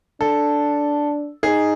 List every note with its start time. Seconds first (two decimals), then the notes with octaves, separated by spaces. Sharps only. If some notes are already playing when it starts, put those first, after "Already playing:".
0.21 D4 A4
1.43 D#4 G#4